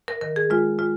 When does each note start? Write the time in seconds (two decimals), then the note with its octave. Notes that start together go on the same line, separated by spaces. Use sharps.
0.08 A#4
0.21 D#3 A#4
0.36 G#4
0.50 G#3 F4
0.79 G#3 F4